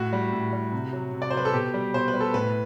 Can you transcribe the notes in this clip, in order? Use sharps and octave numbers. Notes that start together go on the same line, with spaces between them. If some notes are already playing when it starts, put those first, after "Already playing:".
Already playing: A2 F#4
G3
A2
G3
C3
F#3
C3
D5
C5
F#3 B4
A4
B2 G4
G3
B2 C5
B4
G3
A4
A2 B4